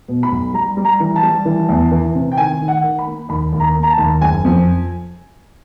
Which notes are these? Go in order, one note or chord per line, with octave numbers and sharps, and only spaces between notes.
B2
B5
B1
G3 A#5
G3
A#5
E3
A5
G3
E3
E2
E3
C3
G5
D#3 G#5
D#3
F#5
D#3
B5
A#3
D#2 B5
D#2
A#5
A#3
A#5
A5
D#2
F#1 G#5
F2